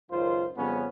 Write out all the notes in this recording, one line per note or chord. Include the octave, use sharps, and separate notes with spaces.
C#2 F#2 D#3 F4 C5
F2 C#3 G3 B3 C#4